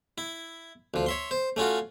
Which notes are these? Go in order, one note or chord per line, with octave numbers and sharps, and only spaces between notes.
E4
D2 F3
C#5 E5 C6
C5
A3 C#4 F4 F#4